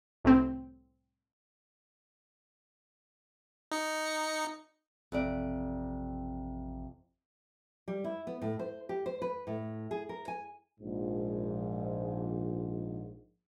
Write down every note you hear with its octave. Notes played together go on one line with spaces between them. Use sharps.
C2 A2 C4
D#4 C#7
A1 F2 C3 D5
G3
E4
B3
A2
C5
G4
C5
B4
A2
G#4
A#4
G#5
A#1 G#2